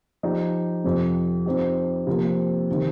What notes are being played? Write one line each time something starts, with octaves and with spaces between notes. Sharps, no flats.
F3 D#4 G4
F2 C3 F3
F3 C4 D#4 G4
C3 F3 A#3
C3 D#3